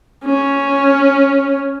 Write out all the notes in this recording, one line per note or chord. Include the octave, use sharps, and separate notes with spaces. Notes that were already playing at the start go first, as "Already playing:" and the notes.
C#4